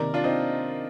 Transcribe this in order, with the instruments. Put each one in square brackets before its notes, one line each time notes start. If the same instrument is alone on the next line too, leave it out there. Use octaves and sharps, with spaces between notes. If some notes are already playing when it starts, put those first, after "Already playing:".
Already playing: [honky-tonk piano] C3 D#3 A#3 [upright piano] A#4 D5
[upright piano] D4 F4
C4 D#4